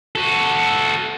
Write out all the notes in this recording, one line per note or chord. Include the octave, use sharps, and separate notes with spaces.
F#4 A4